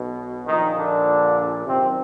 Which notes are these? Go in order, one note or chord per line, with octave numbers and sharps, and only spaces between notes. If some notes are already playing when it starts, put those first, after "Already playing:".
Already playing: B1 B2
A#1 A#2 D#3 F3 D#4
D3 D4
F#2 C3 D#3 C4